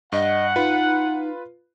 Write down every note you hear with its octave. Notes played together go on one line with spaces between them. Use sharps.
G2 D#5 F#5
D#4 F4 B4